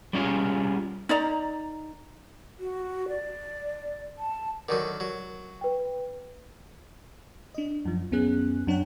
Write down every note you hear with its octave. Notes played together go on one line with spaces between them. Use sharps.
G3 C#4 E4 F4 G#4
D#4 D5 A#5
F#4
D5
A5
D3 D#3 F#3 A#4
F#3
B4 G5
D4 D#5
F#2 F3
C#2 F#2 B3 C#4 G#4 F#6
F#2 D4 C#5 F#5 G5